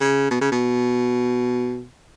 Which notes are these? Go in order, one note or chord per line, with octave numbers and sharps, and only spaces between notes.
C#3
B2
C#3
B2